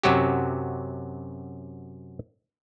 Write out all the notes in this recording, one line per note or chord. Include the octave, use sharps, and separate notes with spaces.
F#2 C3 F#3 F#4 G4